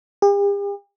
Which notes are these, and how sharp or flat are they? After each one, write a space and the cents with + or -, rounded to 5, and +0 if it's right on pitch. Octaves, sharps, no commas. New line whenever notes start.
G4 +45